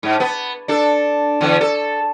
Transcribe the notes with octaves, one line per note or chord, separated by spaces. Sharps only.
G#2
B3
D4 A4
E2 D3
A4